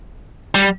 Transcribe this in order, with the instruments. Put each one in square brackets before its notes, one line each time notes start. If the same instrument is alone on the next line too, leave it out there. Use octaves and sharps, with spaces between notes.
[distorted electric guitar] G3